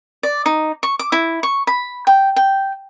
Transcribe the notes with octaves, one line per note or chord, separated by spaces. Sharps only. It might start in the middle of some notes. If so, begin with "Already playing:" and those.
D5
D#4
C#6
D6
E4
C#6
B5
G5
G5